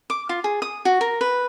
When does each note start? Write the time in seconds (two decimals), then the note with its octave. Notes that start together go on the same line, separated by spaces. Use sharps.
0.10 D6
0.29 F4
0.44 G#4
0.62 D#6
0.85 F#4
1.01 A#4
1.21 B4